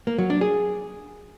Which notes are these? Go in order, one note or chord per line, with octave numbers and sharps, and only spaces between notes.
A#3
F#3
D4
G#4